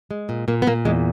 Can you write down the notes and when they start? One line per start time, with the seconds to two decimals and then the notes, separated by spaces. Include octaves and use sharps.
0.11 G#3
0.29 A#2
0.48 A#2 A#3
0.62 B3
0.67 A#2 A#3
0.85 E2 G#3